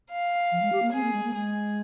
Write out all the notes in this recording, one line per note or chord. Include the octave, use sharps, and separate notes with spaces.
F5
F3
G#3
G4
A#3
C4 G#4
A#3
G#3
A#3
G#3 G#4